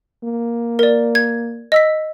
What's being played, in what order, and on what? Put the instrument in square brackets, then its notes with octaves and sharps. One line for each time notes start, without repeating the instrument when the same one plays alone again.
[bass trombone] A#3
[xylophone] A#4 D5
G#6
D#5 E6 B6